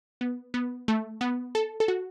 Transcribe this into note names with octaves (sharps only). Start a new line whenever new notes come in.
B3
B3
A3
B3
A4
A4
F#4